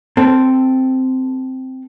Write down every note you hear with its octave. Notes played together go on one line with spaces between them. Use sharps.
C4 A4